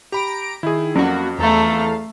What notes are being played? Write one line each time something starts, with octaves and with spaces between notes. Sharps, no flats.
G4 A#5 B5 D7
D#3 E4 G#4
F2 F#3 A#3 C#4 F#4
E2 A3 A4 F5 A#5